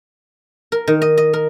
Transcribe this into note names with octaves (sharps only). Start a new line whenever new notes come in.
A#4
D#3
D#5
D#5
A#4